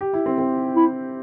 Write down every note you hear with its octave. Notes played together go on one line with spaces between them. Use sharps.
G4
E4
C4
C4
E4